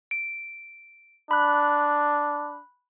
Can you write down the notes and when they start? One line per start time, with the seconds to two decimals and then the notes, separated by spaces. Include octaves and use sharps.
0.11 D7
1.31 D4 B5 F#6